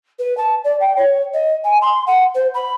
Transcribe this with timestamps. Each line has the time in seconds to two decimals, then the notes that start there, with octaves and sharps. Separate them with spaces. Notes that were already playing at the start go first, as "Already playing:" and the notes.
0.19 B4
0.37 A5
0.64 D5
0.80 G5
0.96 C#5
1.33 D#5
1.64 G#5
1.81 C6
2.06 F#5
2.35 C5
2.54 B5